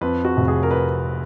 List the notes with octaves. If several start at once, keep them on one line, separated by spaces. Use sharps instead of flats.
F2 B4
F#4
F1
G#4
A#4
B4